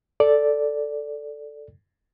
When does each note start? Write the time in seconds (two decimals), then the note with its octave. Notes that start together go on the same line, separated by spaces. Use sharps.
0.20 A4 D5